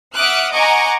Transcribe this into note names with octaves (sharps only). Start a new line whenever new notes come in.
E5 F#5 D6 D#6 F6 F#6
D#5 F#5 G#5 A#5 C#6 D6